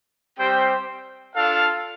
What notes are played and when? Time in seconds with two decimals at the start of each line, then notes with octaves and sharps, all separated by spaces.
0.39 G3 C4 G4 C5 G5
1.35 D4 F4 A4 F5